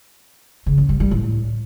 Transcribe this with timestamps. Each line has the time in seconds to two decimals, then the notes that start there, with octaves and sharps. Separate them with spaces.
0.66 C#3
0.78 F#2
0.89 G3
1.00 G3
1.11 A2